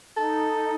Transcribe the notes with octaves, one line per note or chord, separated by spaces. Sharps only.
D#4 A4